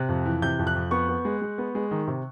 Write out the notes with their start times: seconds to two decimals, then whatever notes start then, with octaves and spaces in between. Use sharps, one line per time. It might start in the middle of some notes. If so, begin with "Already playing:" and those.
Already playing: C3 F#6
0.09 F2
0.25 E3
0.42 C3 G6
0.59 F2
0.67 F#6
0.75 F2
0.91 B3 C#6
1.09 B3
1.25 G#3
1.42 G#3
1.58 B3
1.75 G#3
1.91 D#3
2.07 C3